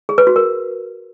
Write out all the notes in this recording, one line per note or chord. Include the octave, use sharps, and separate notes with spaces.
G#4
B4
F#4
A#4